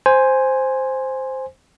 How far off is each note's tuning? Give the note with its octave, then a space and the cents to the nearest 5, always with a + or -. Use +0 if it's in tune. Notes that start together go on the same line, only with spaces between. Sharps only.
C5 +0 G#5 -5